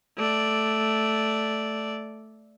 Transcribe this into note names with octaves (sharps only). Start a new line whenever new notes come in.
A3 D5